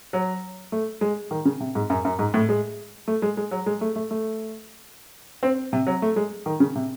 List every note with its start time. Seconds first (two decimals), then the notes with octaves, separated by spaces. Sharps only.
0.13 F#3
0.72 A3
1.01 G#3
1.31 D#3
1.45 C#3
1.60 C3
1.75 G#2
1.90 F#2
2.05 F#2
2.19 G#2
2.34 A2
2.49 G#3
3.08 A3
3.22 G#3
3.37 G#3
3.51 F#3
3.66 G#3
3.81 A3
3.96 A3
4.11 A3
5.43 C4
5.73 C3
5.87 F#3
6.02 A3
6.16 G#3
6.46 D#3
6.60 C#3
6.75 C3